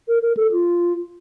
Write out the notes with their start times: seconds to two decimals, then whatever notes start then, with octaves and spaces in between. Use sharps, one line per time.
0.08 A#4
0.22 A#4
0.37 A4
0.52 F4